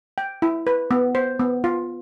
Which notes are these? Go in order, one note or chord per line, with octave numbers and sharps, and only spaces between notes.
G5
E4
B4
B3
C5
B3
F4